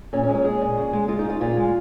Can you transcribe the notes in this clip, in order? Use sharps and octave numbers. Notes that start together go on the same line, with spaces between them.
A#2 C#4
C#4
G#3
C#4
G#3 G#4
A#2
C#3
G#3
G#3 F4
D#4
C#3
F4
A#2 F4
G#3